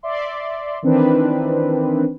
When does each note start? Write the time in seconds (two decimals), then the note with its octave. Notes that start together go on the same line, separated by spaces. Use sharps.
0.03 D5 E5 C6
0.83 D#3 E3 C4 D4 B4